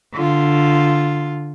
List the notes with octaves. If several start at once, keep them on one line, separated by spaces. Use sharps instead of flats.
D3 F4